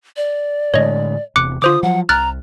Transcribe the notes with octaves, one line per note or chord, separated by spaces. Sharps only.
D5
A2 D3 G#3 C#5 D#5
E1 C3 D6 F#6 C#7
D3 F4 C5 D6 D#6
F3 F#3 F#5
C2 A#5 F6 F#6 A6